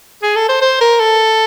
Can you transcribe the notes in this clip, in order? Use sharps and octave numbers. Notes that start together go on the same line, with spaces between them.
G#4
A4
C5
C5
A#4
A4